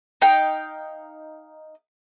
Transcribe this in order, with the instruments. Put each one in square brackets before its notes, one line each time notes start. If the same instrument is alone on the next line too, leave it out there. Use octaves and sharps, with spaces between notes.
[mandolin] D#4 F5 G5